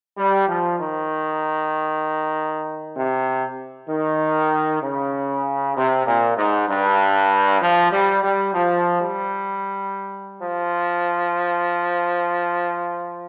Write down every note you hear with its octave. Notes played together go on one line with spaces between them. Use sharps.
G3
F3
D#3
C3
D#3
C#3
C3
A#2
G#2
G2
F3
G3
G3
F3
G3
F3